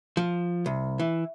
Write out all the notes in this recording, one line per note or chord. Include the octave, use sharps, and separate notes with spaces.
F3
C2
E3